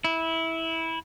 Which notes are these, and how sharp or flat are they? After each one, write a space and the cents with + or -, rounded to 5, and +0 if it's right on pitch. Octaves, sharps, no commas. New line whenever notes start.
E4 -15